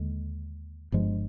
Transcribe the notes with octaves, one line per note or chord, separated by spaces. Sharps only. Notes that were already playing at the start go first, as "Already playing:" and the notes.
Already playing: D#2 D3 G#3
G1 G2 F3 G#3